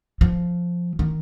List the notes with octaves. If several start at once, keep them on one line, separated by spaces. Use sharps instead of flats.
F3
D#3